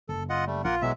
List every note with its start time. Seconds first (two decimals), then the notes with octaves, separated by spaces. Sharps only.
0.09 F#1 A4
0.30 F4 D#5 F#5
0.47 G3 A3
0.64 A#1 A#3 F4 A#4 F#5
0.82 B2 E3 F#3 G#3 E5